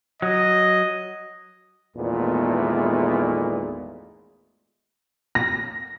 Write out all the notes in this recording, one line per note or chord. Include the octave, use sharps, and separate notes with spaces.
F#3 D#5
G#1 E2 A#2 G#3 A3 B3
A#6